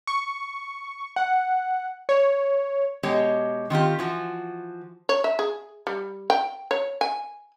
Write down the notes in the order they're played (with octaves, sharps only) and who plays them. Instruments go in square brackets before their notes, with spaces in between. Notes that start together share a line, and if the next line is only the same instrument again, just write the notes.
[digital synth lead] C#6
F#5
C#5
[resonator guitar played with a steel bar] B2 G#3 G4 C#5 D#5
D#3 C4 F4 G4
E3 F3 F#4
[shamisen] C#5
E5
G#4
G3
G5
C#5
G#5